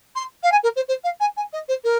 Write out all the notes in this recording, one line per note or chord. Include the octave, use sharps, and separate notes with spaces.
C6
F5
G#5
A#4
C5
C5
F5
G#5
G#5
D#5
C5
A#4